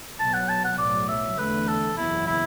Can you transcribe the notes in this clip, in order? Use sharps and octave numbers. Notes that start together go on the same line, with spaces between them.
B1 B2 F#3 B3 A5
F#5
A5
F#5
B1 A2 F#3 D5
E5
E2 D3 A3 B4
A4
F#1 E2 B2 B3 E4
E4